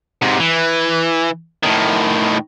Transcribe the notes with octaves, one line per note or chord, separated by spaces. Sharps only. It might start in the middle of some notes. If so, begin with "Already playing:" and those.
G#2 C3
E3
A2 D#3